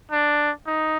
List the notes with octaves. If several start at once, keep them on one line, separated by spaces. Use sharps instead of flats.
D4
D#4